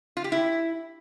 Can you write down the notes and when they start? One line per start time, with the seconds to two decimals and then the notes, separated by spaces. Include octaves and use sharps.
0.17 F4
0.24 G4
0.32 E4